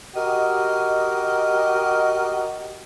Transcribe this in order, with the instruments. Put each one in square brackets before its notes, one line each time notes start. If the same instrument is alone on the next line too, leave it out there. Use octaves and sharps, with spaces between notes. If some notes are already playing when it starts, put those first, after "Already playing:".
[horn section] F#4 G4 A#4 D#5